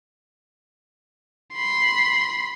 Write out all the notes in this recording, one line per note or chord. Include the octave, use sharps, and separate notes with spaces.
B5 C6